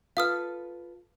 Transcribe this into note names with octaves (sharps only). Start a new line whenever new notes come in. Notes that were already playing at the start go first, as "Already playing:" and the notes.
F4 A4 B4 F5 D#6 F6